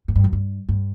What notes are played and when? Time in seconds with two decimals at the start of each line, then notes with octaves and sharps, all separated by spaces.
0.08 G#2
0.15 G2
0.24 F#2
0.33 G2
0.69 G2